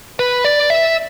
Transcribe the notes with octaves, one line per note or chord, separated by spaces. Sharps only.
B4
D5
E5